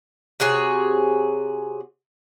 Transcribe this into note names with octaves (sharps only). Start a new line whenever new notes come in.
C3 F#4 G#4 C#5